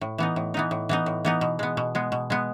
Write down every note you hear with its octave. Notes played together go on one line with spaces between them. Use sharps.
A2
E3 B3 D#4
A2
E3 B3 D#4
A2
E3 B3 D#4
A2
E3 B3 D#4
B2
G#3 B3
B2
G#3 B3
B2
G#3 B3